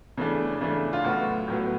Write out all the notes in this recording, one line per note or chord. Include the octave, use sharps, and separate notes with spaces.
C#3 E3 A3 D4
C#3 E3 A3 D4
F4
A2 F#3 B3 F#4
A2 F#3 B3